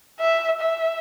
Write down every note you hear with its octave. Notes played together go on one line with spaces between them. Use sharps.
E5
E5